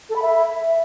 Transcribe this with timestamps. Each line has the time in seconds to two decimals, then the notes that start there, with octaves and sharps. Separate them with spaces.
0.10 A4
0.16 B5
0.22 E5